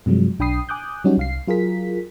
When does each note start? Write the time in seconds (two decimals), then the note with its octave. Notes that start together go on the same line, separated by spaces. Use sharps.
0.06 G2 C3 F3 F#3 G#3
0.39 B1 D4 G5 B5 D#6 C7
0.69 G#5 D6 D#6 F#6 G6
1.04 F#3 G3 C#4 D#4 F#4
1.17 C2 F5 C7
1.48 F#3 F4 G#4 A#4 B6